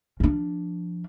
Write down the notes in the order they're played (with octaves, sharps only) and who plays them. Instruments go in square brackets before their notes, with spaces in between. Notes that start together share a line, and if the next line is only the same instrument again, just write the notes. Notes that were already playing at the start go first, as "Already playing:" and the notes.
[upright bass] F3 D4